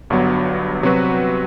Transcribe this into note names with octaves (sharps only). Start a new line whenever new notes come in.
G1 G2 F#3 B3
C3 F#3 C4 F#4 B4